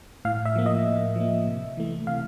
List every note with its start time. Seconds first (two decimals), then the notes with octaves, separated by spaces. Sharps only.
0.25 A2 F5
0.45 E5
0.55 F3 A#3
0.66 D#5
0.86 A2
1.16 F3 A#3
1.47 C3
1.77 E3 A3
2.07 C3 F5